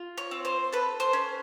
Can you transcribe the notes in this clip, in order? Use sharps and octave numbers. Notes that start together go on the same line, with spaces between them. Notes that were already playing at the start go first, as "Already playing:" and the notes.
Already playing: F4
C#5
C4
C5
A4 B4
C5
C#4